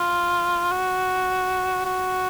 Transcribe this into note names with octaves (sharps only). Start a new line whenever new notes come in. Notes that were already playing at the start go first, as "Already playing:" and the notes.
Already playing: F4
F#4
F#4